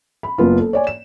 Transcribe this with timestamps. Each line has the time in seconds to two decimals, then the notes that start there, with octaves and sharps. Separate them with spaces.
0.23 B5
0.38 F#1 B3 F4
0.59 A4
0.73 C#5 D5 G#5
0.87 E7